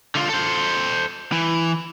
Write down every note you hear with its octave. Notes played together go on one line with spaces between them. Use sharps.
D3 F4
A4 C5
E3